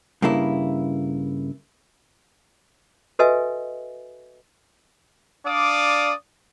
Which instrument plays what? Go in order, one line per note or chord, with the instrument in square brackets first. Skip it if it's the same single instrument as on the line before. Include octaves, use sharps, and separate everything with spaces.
[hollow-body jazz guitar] G2 C#3 A#3 E4
[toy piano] F#4 A4 B4 D#5 E5 G#5
[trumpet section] D4 D5 F5 D6 D#6